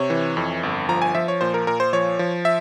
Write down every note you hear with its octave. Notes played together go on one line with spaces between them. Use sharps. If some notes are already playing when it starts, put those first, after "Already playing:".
Already playing: C3 C#5
E3
F2
G1
F3 A#5
G#5
F3 E5
C#5
A#2 C5
A#4
A#2 A#4
C5
F3 C#5
F3
E5